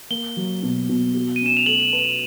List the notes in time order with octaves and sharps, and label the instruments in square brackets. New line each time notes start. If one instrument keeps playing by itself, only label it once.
[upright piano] A#3 [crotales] G7
[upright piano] F#3
B2
B2
F#4
[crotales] D#7
[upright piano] C#4 [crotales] E7
[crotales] F7
[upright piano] A3 [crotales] F#7
[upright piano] B4